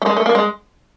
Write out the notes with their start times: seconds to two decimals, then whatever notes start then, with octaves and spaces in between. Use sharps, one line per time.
0.02 A3
0.06 G#3
0.17 A3
0.26 A#3
0.35 G#3